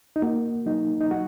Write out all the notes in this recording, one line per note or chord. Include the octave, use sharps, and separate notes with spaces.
D#4
A#3 F#4
F#3 D#4
D#4
F#3 F#4